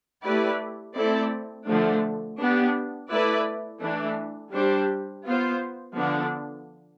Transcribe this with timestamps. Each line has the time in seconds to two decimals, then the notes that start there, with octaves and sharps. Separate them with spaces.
0.24 A3 E4 G4 B4 D5
0.95 A3 C4 E4 A4 D5
1.67 D3 F3 A3 D4
2.39 B3 D4 G4
3.10 A3 E4 B4 D5
3.81 E3 A3 D4
4.53 G3 D4 G4 C5
5.25 B3 F4 C5
5.97 D3 F3 B3 D4